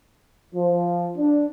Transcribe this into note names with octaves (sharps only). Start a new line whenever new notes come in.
F3
D4